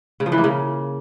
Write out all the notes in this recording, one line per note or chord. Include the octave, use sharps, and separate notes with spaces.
C#3
F3
E3
A#3
C#3